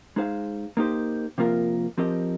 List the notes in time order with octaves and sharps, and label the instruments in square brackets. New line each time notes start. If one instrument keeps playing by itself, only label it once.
[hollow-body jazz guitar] G#3 D#4 G#4 C5 F5
A#3 D#4 G4 C5
C3 F3 A#3 F4 A#4
F3 C4 G4 A#4 D#5